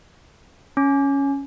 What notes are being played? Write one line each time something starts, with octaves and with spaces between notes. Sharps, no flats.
C#4